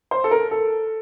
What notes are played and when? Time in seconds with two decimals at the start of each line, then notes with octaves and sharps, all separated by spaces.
0.11 C5
0.24 A4
0.31 A#4
0.51 A4